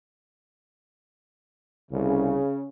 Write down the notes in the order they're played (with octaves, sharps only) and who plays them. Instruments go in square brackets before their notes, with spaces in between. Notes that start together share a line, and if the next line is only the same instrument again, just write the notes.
[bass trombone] C2 [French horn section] C#3